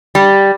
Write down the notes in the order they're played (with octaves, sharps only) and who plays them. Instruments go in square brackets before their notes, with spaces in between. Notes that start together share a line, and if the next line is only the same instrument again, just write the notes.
[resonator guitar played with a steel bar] G3